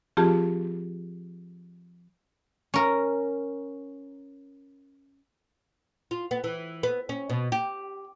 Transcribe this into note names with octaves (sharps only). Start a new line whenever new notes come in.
F3 C4 F4 G4 G#4 A5
C#4 A#4
F4
B3
E3
B3
C#4
B2
G4